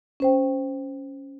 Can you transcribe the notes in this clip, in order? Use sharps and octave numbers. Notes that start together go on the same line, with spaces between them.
C#4 C5 G5